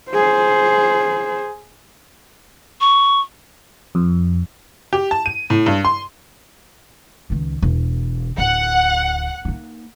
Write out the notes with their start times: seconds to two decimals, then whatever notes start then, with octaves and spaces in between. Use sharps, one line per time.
0.11 G#4 C5
2.81 C#6
3.95 F2
4.93 G4
5.11 A5
5.26 D#7
5.50 A2
5.66 G2
5.85 C6
7.30 C#2 D#3
7.62 E1
8.38 D1 F#5
9.45 A#3 D#4